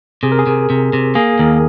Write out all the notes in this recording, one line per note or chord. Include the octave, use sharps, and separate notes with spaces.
C3 G#4
A#4
G#4
C3
C3
C3
A#3 G#4
D#2 A#4